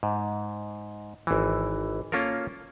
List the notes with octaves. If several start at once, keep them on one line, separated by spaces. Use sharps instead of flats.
G#2
G#1 E3
A#3 C#4 F4 A4 A#4